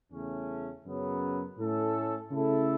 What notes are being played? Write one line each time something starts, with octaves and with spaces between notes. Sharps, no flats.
E2 C#3 A3 C#4
F#2 C#3 F#3 B3
A2 A3 C#4 A4
C#3 A3 E4 A4